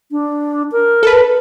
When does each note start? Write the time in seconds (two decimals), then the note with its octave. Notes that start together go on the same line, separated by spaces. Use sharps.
0.11 D4
0.72 A#4
1.03 A4 B4